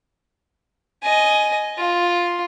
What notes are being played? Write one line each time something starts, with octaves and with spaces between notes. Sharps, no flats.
D#5 G#5
F4